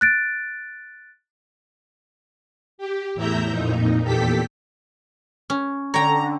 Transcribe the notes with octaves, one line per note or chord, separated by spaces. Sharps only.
F#6 A6 D7
G4
E2 A2 E4 E5 A#5 G6
F2 A#2 D#4
E2 A#2 G4 A4 G5 B6
C#4
D3 C#5 G5 A#5